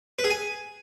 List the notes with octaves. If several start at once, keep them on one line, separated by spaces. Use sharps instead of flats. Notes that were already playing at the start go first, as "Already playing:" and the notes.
B4
G#4
G#5